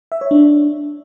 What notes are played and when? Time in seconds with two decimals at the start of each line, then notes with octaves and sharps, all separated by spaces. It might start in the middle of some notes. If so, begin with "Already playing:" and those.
0.12 E5
0.21 C#5
0.31 D4